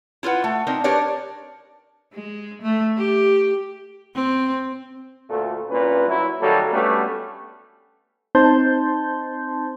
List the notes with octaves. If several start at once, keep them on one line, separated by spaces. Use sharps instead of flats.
E4 F4 A#4 B4 F#5
A3
C4 D4 D#4 A#4
D4 G4 A#4 B4 C#5 D5
G#3
A3
G4
C4
D2 A#2 A3
C2 A#2 C#4 B4
F#3 E4
D#3 F#3 G3 A#3 A4
G3 A3 B3 C#4 D4 F#4
C4 D#4 C5 A5 C6 G6